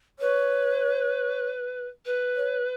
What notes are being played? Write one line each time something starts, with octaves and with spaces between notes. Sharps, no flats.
B4 C#5
B4
C#5